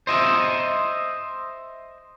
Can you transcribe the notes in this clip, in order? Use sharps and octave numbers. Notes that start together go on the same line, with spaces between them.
C5 D#5 E5